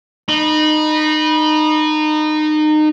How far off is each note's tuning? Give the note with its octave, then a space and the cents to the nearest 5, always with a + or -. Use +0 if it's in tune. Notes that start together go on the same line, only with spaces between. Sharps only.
D#4 -25 B5 -30